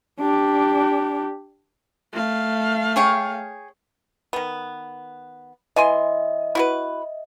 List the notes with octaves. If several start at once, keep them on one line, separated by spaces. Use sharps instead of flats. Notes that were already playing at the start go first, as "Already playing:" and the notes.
D4 G4
A3 F5
G#4 C#5 G5
D#3 B3
E3 D#5 E5 G#5 C6
E4 F#4 B4